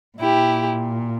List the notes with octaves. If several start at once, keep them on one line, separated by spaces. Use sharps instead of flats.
A#2 E4 G4